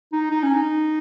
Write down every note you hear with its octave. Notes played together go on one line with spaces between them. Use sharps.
D#4
D#4
C#4
D#4